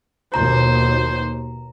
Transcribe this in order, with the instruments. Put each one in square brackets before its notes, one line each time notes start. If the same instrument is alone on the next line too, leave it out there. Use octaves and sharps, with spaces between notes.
[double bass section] D#2 B2 [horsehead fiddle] C5 [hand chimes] A#5